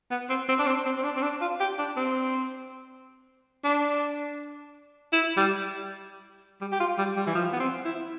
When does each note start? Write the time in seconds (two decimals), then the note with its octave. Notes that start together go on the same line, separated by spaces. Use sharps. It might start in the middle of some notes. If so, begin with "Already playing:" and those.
0.11 B3
0.29 C4
0.49 C4
0.59 D4
0.67 C4
0.85 C4
0.98 C4
1.04 D4
1.17 C4
1.23 D4
1.41 F4
1.60 G4
1.79 D4
1.97 C4
3.64 D4
5.13 E4
5.37 G3
6.61 G3
6.72 G4
6.80 F4
6.98 G3
7.17 G3
7.27 E3
7.35 F3
7.52 B3
7.60 C4
7.85 E4